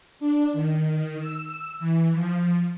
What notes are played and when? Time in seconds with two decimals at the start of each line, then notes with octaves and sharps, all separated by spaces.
0.20 D4
0.53 D#3
1.20 E6
1.79 E3
2.13 F3